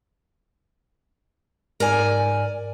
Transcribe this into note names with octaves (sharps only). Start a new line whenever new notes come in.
G#2 A#4 D5 G#5